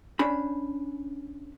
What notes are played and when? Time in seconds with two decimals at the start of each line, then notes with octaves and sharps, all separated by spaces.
0.19 C#4 D4 B5